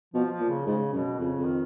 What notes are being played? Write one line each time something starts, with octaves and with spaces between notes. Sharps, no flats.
B2 F3
F3
A#2
C#3
G#2 C#3
F#2 B2
F2 C#3
F2
D#3